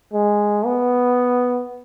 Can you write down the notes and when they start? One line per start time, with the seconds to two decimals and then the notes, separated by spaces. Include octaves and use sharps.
0.13 G#3
0.65 B3